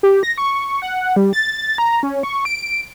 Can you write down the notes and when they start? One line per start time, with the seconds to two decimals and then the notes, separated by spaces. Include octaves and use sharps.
0.03 G4
0.23 A#6
0.38 C#6
0.82 F#5
1.16 G3
1.33 A6
1.78 A#5
2.03 C#4
2.23 C#6
2.45 D7